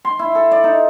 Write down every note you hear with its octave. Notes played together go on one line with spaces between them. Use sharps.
C6
E4
A4
D5
D#4